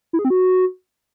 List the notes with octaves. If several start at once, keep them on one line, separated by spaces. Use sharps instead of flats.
E4
G#4
C4
F#4